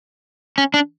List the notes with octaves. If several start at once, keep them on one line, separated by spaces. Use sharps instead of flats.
C#4
D4